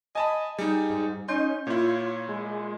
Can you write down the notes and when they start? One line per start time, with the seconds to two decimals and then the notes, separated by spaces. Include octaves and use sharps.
0.15 D#5 G#5 A5 B5
0.58 G3 D#4 G#4
0.90 G#2
1.28 C#4 D#4 C6 G6
1.67 A#2 E4 F4 C#5
2.29 G#3